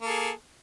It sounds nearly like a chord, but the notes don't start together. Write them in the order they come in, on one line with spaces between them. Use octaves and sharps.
A#3 A4 G#4